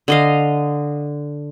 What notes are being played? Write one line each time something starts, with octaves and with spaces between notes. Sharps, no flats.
D3 D#5 F5